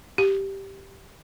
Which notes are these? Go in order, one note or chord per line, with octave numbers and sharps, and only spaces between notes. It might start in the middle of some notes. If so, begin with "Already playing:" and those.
G4